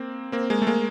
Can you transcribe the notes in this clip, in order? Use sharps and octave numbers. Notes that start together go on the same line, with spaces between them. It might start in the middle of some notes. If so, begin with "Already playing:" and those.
Already playing: A#3 C4
A#3 C4
G#3 A#3
A3
G#3 A#3